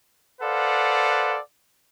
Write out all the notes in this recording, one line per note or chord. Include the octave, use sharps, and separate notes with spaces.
A4 B4 C5 D5 F5 F#5